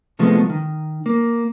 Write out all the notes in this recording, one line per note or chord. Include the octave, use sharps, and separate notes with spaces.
C2 C3 F3 G#3 A3 B3
D#3
A#3